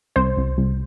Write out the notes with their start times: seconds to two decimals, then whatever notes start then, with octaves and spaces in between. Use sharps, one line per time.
0.16 C2 C5
0.37 C2
0.58 C2